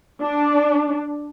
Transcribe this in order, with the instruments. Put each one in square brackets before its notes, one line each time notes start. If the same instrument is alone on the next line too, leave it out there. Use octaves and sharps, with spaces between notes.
[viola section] D4